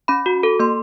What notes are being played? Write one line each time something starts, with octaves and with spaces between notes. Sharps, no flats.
C#4 B5
F#4
A4
A#3 C6